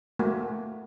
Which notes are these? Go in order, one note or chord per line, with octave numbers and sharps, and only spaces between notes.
A3 A#3 F#4